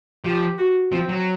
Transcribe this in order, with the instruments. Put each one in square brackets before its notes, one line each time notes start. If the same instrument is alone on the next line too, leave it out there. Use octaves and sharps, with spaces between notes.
[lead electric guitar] F3 [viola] G4
[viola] F#4
[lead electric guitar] F3 [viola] C4
[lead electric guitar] F#3